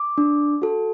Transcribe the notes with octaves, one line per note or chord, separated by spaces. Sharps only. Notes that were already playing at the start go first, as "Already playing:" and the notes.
Already playing: D6
D4
F#4 A4